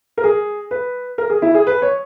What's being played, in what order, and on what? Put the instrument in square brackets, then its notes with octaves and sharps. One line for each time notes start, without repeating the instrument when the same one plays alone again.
[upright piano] A#4
G#4
B4
A#4
G#4
E4
G#4
B4
C#5